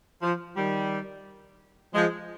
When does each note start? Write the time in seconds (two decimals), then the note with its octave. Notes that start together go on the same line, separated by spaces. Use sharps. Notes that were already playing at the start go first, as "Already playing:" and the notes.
0.22 F3
0.57 D#3 G3
1.94 F3 G#3